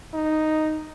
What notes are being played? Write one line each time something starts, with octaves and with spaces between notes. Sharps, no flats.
D#4